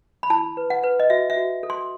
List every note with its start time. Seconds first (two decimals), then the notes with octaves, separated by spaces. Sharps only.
0.23 B5
0.30 E4 A5
0.57 B4
0.70 F#5
0.84 B4
1.00 D#5
1.10 F#4 E5
1.30 E5
1.36 F#4
1.63 A4
1.70 C6